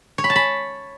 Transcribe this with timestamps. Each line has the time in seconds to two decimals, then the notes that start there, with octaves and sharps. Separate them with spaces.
0.18 C#5
0.24 B5
0.30 A5
0.36 B5